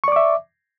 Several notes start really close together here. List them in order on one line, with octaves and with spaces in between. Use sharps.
C#6 D5 D6 E5